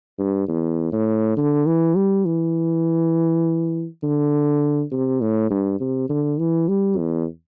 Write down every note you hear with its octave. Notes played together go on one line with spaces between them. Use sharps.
G2
E2
A2
D3
E3
G3
E3
D3
C3
A2
G2
C3
D3
E3
G3
E2